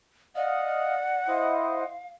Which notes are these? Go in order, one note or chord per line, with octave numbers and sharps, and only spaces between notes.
D5 D#5 F5 F#5
E4 C5 D#5 F5